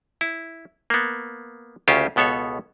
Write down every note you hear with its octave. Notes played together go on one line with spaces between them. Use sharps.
E4
A#3 B3
D2 C#3 C#4 F4 G4 C5
C#2 B2 B3 A4 C#5